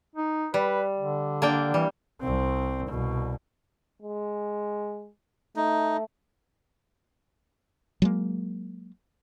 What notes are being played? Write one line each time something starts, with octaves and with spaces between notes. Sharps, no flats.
D#4
G3 B4
D3
A#3 D4 G5
E3 G3
C2 C4
C2 B2
G#3
A3 D#4
F#3 G#3 A#3